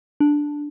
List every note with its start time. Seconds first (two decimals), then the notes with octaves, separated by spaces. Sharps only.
0.20 D4